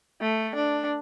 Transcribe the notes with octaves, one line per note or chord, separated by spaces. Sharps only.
A3
D4